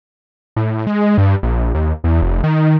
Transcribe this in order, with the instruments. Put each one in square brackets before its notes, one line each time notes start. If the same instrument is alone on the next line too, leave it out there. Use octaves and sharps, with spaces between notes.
[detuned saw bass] A2
G#3
G2
A#1
D#2
E2
F1
D#3